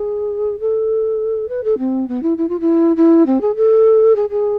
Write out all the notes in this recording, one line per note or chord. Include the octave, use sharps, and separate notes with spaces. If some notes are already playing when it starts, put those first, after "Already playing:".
Already playing: G#4
A4
B4
A4
C4
B3
E4
E4
F4
E4
E4
C4
G#4
A4
G#4
G#4